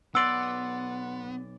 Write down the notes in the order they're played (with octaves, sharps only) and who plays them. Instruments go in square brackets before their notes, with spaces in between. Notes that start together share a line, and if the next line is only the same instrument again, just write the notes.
[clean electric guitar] B1 D5 [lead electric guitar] B3 [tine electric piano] F#5 C6 [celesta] E6